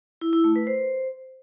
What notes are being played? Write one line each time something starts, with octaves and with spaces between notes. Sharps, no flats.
E4
E4
A3
B4
C5